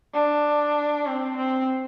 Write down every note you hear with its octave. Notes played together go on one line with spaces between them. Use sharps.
D4
C4
C4